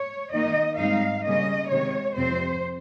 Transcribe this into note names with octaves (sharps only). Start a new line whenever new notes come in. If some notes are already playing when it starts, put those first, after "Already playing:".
Already playing: C#5
D#3 A#3 D#4 D#5
G#2 G3 C4 D#4 F5
C#3 G3 A#3 C#4 D#5
C3 D#3 G#3 C#5
F2 C3 F3 C4 C5